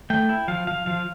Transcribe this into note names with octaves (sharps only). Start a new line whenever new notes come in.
A3 G5
E4
F3 F5
F3 F5
F3 F5